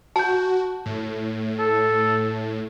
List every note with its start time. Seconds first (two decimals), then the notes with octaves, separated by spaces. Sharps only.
0.16 F#4 A5 G6
0.86 A2
1.59 A4